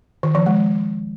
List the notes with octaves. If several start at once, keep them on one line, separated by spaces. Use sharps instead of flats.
D#3
F3
G#3